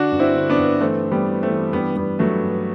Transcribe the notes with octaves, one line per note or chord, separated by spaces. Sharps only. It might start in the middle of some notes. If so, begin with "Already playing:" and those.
Already playing: D3 D4 F#4
G2
C4 E4
D3
B3 D4
G2
E3 A3 C4
E3
G3 B3
E3
A3 C4
E3
G2 G3 B3
G2 G3 B3
G2 F#3 A3
G2